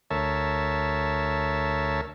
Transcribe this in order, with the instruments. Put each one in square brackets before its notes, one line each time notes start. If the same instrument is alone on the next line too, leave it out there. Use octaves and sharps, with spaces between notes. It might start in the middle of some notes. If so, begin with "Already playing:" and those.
[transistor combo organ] D2 A#4 C#5 E5 A5